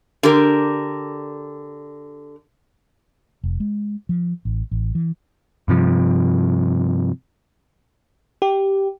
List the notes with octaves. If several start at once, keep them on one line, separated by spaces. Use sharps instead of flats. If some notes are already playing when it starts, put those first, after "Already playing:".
D3 G4 A#4
F1
G#3
F3
A1
A1
E3
G2 C3 F3
G4